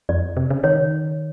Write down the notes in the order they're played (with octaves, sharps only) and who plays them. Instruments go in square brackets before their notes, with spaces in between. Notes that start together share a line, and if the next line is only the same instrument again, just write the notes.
[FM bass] F2 [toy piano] D5
[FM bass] C3
C#3
[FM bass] D#3 [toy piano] C#5